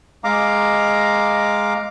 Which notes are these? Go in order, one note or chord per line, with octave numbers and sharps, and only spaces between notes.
G#3 F5 A#5 D6